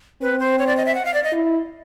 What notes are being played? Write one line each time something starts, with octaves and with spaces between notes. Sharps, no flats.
C4 B4
C5
C#5
D5
D#5
E5
F#5
F5
D5
D#5
E4